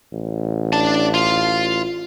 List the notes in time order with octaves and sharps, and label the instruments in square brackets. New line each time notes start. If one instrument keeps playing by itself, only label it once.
[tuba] A1
[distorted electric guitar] D4 A5
F4